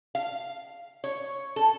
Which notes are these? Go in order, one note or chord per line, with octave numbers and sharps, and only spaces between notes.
F5
C#5
A4